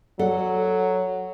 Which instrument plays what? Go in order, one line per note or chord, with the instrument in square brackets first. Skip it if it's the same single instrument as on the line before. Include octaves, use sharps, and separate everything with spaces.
[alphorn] F#3 [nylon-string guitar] A4 D5 F#5